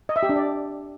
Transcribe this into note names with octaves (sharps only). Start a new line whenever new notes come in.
D#5
E5
G4
D4
D5